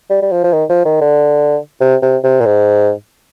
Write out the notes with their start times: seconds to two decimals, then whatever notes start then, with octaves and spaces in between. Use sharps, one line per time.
0.10 G3
0.22 G3
0.32 F3
0.44 F3
0.53 D#3
0.69 F3
0.85 D#3
1.01 D3
1.80 C3
2.02 C3
2.24 C3
2.41 A#2
2.46 G#2